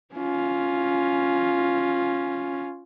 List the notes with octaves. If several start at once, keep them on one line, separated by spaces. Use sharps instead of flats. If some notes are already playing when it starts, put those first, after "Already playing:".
C#4 F4